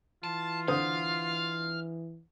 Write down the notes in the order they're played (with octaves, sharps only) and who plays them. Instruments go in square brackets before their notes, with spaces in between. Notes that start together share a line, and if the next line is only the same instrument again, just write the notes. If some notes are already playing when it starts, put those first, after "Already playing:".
[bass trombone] E3 [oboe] F4 [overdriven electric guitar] A5
[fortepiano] D3 C5 D#6 [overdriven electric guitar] F5